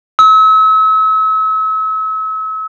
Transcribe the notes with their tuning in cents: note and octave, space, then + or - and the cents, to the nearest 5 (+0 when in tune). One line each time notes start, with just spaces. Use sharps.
E6 -40